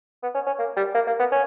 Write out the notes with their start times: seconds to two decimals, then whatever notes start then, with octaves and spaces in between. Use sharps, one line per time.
0.23 B3
0.34 C#4
0.47 C#4
0.59 A#3
0.77 G3
0.95 A#3
1.07 A#3
1.19 B3
1.32 C#4